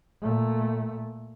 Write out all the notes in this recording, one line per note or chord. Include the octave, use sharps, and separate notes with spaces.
A#2 A3